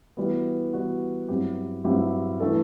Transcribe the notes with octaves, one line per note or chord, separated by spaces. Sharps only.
E3 G3 B3 F#4
E3 G3 B3 F#4
G2 F#3 C4 E4 G4
G2 F#3 C4 E4 G4
E3 A3 D4 A4